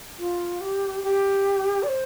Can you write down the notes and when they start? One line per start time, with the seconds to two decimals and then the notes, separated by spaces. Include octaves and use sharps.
0.19 F4
0.61 G4
1.04 G4
1.83 D5
1.88 C5